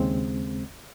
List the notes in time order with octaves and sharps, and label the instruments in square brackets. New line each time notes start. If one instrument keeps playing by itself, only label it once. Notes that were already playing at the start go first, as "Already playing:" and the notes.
Already playing: [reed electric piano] D#2 C#3 G#3 C4